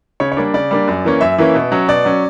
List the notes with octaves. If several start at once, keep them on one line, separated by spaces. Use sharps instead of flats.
C#3 C#5
C#5
G3 A#3 D4
C#3 D5
G3 A#3 D4
F#2
E3 A#3 C#4
F#2 E5
E3 A#3 C#4
B2
F#3 C#4
B2 D5
F#3 C#4